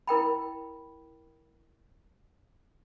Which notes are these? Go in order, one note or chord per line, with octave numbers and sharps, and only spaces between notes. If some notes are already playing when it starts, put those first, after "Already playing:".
E4 A#4 G5 B5